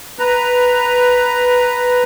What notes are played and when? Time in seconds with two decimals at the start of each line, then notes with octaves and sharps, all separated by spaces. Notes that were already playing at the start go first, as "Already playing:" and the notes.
0.19 B4 A#5